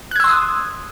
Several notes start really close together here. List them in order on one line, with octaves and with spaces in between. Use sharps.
F#6 G#6 E6 C6 D#6